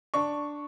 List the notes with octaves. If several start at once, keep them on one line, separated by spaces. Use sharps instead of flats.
D4 C#6